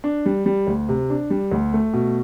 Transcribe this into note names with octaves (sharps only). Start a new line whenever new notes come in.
D4
G3
G3
D2
C3
D4
G3
D2
A3
B2